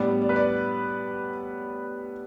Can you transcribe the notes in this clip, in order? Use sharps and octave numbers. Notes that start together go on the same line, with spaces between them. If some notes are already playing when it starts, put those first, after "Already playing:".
Already playing: A2 G3 B3 D4 D5
D5
B4
D5